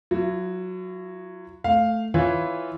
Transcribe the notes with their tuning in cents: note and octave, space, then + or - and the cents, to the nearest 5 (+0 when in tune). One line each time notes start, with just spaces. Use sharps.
F#3 -10 E4 +45
A3 +0 F5 +0
E3 +0 F4 +0 C#5 +0